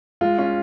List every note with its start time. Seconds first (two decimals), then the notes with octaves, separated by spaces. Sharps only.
0.21 G#3 F4
0.38 C#4 F4